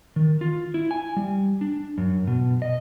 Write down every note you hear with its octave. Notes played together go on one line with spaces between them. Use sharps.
D#3
F4
E4
G#5
G3
D4
F#2
B2
D#5